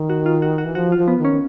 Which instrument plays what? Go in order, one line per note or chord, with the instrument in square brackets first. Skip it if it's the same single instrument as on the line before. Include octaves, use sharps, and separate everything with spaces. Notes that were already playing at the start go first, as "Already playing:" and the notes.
Already playing: [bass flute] D#3
[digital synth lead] F#4
F4
F#4
F#4
[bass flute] E3
[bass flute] F3 [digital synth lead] F#4
[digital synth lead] F4
[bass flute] F3
[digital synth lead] B3
[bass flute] D#3
[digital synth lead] C#4